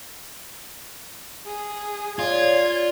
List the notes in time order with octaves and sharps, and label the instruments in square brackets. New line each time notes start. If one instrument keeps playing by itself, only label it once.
[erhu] G#4
[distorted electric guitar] F4 [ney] C#5 [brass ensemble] D5 [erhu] G#6